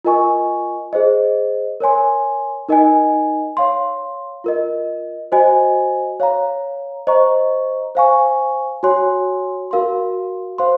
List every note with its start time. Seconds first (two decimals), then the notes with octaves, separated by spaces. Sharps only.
0.05 F4 A#4 D#5 G#5 C#6
0.93 G#4 C5 D#5
1.80 A#4 C#5 G#5 C6
2.69 D#4 A#4 D#5 G#5
3.57 C#5 F5 C6
4.44 F4 A#4 D#5
5.32 F#4 C5 D#5 G#5
6.20 C#5 F5 A#5
7.07 C5 D#5 A#5 C#6
7.95 C5 F5 G#5 C#6
8.83 F#4 C#5 G#5 C6
9.71 F#4 A#4 F5 C6
10.58 C5 F5 C6